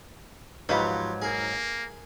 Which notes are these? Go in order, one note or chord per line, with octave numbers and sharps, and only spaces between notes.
G#2 F3 F#3 G4 B4 C#5 F5 B5
A#3 G#4 A#4